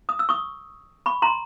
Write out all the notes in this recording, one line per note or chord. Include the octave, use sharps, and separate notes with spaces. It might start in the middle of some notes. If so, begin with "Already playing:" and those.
D#6
E6
C#6 D#6
B5 C#6
A#5 C6